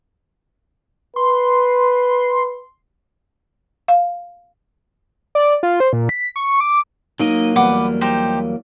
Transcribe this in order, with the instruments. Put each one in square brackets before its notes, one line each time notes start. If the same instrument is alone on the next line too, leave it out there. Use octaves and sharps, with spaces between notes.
[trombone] B4 [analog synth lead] C6
[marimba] F5
[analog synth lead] D5
F4
C5
A#2
B6
C#6
D6
[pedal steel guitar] F#3 A#3 D#5 [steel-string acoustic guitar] D#4
[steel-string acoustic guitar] E2 G3 [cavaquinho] B4 F#5 D6
[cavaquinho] D#4 G4 C5